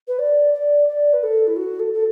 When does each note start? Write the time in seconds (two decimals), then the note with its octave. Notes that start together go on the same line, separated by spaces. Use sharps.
0.07 B4
0.19 D5
0.53 D5
0.88 D5
1.13 B4
1.23 A4
1.47 E4
1.56 F#4
1.79 A4
1.93 A4